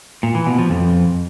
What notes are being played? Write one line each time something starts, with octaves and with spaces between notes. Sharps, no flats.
A#2
E3
B2
F3
F2